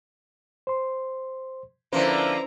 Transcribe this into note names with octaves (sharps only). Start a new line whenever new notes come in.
C5 C6
D3 F3 A#3 C#4 E4 B4 C5 A#5